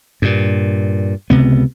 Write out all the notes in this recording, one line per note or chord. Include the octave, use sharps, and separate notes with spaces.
G2 A#2
C#2 C3 B3